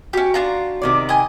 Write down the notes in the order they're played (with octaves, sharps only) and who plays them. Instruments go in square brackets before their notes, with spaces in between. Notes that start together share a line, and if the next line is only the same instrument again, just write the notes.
[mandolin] C#4 G4 [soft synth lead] F#4
[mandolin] D4 F4 A#5
[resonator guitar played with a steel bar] C3 D#3 D5
[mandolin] D#5 G#5 [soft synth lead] G5